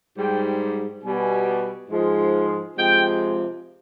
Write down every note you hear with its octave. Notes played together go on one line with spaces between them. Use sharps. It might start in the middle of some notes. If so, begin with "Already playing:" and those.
G#2 G3 G5
B2 G3 G#5
G#2 F3 G#3
C3 F3 G#3 G5